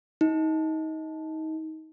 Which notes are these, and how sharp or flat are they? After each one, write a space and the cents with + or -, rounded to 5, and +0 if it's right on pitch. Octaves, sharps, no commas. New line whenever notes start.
D#4 +25